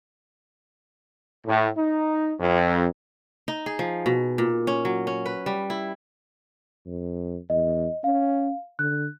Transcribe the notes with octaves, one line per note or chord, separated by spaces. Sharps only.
A2
D#4
F2
D#4
G#4
F3
B2
A#2
C#4
F#3
C#4
B4
G3
E4
F2
E2 D#5
C#4 F5
D3 F#6